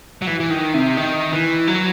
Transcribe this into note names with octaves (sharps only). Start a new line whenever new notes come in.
F#3
E3
E3
D#3
C3
D#3
E3
F#3